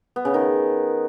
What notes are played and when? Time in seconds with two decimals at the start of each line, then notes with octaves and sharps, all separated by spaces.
0.16 B3
0.25 C#3
0.34 D#3